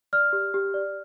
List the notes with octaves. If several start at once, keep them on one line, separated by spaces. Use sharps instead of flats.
D5 F6
G4
G4
D5